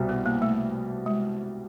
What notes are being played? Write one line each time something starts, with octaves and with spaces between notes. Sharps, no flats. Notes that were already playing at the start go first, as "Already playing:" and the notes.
Already playing: C2 B2 G3 C4
B3
A#3
A3
G#3